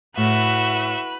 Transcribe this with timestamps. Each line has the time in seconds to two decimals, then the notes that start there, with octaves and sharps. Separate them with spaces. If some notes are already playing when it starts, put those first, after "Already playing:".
0.17 A2 F#4 B4 E5 B5